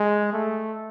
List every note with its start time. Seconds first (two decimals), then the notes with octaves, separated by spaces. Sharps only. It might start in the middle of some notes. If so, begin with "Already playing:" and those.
Already playing: G#3
0.33 A3